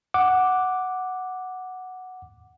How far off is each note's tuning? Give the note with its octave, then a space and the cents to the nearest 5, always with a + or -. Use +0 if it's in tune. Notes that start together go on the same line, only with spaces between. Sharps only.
F#5 +0 D6 +0